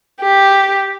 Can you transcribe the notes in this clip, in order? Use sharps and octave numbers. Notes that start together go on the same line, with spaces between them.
G4